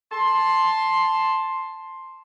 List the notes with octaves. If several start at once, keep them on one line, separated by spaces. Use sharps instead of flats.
A5 C6